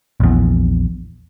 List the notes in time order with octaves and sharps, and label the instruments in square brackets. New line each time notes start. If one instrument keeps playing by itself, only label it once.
[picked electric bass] A#1 E2